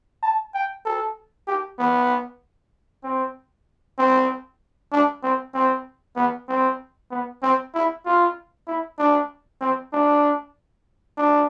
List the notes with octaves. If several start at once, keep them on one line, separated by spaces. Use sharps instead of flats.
A5
G5
A4
G4
B3
C4
C4
D4
C4
C4
B3
C4
B3
C4
E4
F4
E4
D4
C4
D4
D4